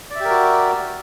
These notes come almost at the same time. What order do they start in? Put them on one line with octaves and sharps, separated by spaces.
D5 E5 G4 A#4 F#4